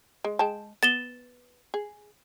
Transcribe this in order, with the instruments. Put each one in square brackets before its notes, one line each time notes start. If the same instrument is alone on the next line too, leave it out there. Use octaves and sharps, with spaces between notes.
[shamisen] G#3
G#3 G5 A5
[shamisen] B3 [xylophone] A6 E7 G7
[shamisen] G#4